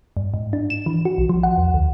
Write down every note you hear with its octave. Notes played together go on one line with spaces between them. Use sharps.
G2
G#2
D4
E7
E3
F#4
B1
F3
F#5
E2
D2